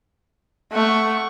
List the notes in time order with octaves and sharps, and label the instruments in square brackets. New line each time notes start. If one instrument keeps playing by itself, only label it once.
[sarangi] A3 [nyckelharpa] F#5 C#6